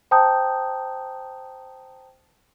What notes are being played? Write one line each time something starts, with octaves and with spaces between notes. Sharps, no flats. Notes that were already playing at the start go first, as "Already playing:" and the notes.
C5 G5 A5 A#5 D#6 G6